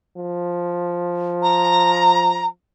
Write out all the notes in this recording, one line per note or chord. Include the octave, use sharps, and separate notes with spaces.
F3
A#5